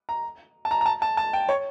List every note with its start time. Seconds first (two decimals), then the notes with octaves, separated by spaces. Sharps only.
0.09 A#5
0.65 A5
0.71 A#5
0.81 A#5
0.86 A5
1.02 A5
1.17 A5
1.33 G5
1.49 C#5